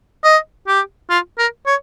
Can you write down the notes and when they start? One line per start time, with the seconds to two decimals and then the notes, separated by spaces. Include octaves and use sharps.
0.24 D#5
0.67 G4
1.10 F4
1.38 A#4
1.66 C#5